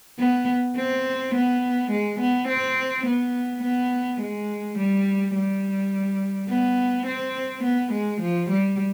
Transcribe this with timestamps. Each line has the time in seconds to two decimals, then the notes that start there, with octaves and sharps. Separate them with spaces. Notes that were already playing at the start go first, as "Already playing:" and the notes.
0.19 B3
0.76 C4
1.34 B3
1.90 G#3
2.20 B3
2.48 C4
3.06 B3
3.63 B3
4.20 G#3
4.78 G3
5.35 G3
6.49 B3
7.06 C4
7.64 B3
7.92 G#3
8.21 F3
8.50 G3